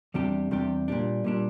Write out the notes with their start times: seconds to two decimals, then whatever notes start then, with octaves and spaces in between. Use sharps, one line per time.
0.14 E2 C3 G3 D4 G4
0.51 E2 C3 G3 D4 G4
0.88 A#2 G3 D4
1.24 A#2 G3 D4